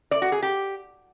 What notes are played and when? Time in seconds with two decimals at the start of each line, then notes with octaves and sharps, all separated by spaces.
0.11 D5
0.22 F#4
0.32 G#4
0.42 G4